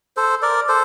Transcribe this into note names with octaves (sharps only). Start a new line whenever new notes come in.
A4 C5
A#4 D5
A4 C5